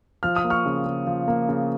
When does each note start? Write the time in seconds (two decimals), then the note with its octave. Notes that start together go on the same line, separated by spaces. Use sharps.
0.23 F3 F6
0.36 D#6
0.44 A#3
0.50 C#6 F6
0.66 C#3
0.86 C#3
1.07 F3
1.28 A#3
1.49 C#3